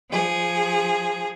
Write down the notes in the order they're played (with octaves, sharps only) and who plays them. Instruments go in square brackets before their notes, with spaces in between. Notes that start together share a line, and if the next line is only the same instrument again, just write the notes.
[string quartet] F3 G#4